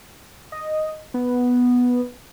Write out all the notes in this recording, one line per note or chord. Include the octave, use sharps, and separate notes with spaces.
D#5
B3